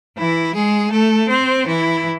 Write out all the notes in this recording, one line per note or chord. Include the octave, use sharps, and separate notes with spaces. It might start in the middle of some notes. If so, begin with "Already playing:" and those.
E3 E4
G#3 G#4
A3 A4
C4 C5
E3 E4